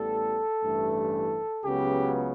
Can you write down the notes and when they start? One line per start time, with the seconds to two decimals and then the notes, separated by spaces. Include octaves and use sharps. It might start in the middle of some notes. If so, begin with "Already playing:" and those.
Already playing: A1 A2 G3 B3 A4
0.64 A1 G2 E3 A3
1.65 C#2 C#3 F#3 B3 G4